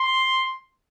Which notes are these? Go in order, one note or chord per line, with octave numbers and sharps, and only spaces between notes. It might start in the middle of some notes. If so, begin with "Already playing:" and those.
Already playing: C6